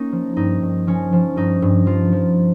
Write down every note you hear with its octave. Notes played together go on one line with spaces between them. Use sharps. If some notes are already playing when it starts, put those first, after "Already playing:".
Already playing: A#3 C#4 D#4
F3
G2 D#4
G2
F3 C#4
F3
G2 D#4
G2
F3 F4
F3